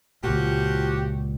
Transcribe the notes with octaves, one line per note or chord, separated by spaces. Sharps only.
C#2 A#2 F3 F#4 G4